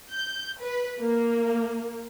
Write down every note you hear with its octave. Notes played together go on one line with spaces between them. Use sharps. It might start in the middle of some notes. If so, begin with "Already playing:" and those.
G6
B4
A#3